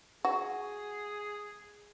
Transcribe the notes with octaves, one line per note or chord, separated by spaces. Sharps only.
F#4 G#4